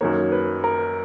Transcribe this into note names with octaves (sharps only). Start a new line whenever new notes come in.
F#2 D#3 A#3 C#5
B4
A#4